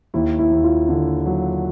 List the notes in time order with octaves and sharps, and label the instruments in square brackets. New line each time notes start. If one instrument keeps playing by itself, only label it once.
[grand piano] D#2 [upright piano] E4
[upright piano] E4
[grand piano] D#2
[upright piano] F4
[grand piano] D3
F#3